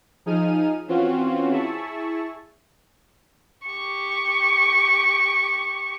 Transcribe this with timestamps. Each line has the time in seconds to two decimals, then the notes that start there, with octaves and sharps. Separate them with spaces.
0.26 F3 D#4 G#4 F6 D#7
0.88 E3 C4 C#4 F4 F#4
1.50 E4 G#4 E5 A5 C#6
3.67 G4 C#6